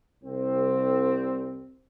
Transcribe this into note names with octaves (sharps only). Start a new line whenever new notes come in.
C2 C4